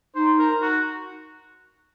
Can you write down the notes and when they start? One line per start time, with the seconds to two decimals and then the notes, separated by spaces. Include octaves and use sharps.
0.14 D#4 C5
0.39 A#4
0.62 F#4